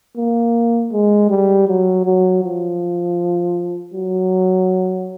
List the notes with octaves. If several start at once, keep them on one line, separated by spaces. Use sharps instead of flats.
A#3
G#3
G3
F#3
F#3
F3
F#3